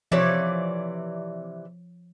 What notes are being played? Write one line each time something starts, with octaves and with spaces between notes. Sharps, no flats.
C3 E3 F3 C#5 D5